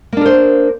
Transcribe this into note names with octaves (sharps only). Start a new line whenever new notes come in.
A#3 D4 A#4 C5